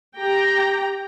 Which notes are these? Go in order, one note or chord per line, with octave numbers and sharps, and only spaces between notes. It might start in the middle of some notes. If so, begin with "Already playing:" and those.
G4 G5 A#5